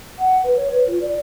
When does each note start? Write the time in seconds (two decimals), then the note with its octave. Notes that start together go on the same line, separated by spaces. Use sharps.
0.18 F#5
0.44 B4
0.57 C#5
0.72 B4
0.87 F4
1.01 D5